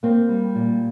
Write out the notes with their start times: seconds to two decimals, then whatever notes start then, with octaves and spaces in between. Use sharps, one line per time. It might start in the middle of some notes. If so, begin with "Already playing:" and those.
0.03 A#3 C4
0.29 G3
0.55 A#2